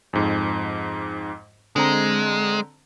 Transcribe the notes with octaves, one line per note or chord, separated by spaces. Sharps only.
F2 G#2
D3 G#3 C4 A#5